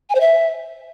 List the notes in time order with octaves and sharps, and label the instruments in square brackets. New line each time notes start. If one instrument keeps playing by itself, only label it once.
[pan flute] G#5
C5
E5